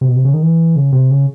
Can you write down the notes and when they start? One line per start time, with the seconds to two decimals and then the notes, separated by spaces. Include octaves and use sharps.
0.01 C3
0.08 B2
0.16 C3
0.25 C#3
0.34 D#3
0.43 E3
0.76 C#3
0.93 C3
1.11 C#3